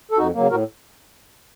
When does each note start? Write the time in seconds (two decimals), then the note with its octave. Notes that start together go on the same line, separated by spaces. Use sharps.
0.11 A4
0.18 F2 D#4 F#4
0.34 C#3 F#3 A#3
0.50 A2 F#4 A#4